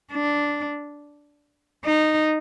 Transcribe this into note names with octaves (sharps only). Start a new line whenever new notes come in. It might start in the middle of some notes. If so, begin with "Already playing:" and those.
D4
D#4